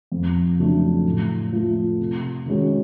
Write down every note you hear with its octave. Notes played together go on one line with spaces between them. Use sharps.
F2
C#3 F#3 A3 D4
A2
F3 A3
C3
D#3 G#3 C#4 F#4